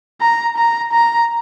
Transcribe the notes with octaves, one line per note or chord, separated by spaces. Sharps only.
A#5
A#5
A#5